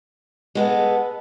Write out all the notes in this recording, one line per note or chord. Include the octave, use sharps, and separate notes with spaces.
G#3 B3 A4